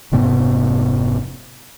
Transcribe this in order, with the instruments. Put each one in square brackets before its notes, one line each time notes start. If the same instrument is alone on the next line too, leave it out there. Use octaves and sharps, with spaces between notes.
[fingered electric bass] F1 G#2 C3 B3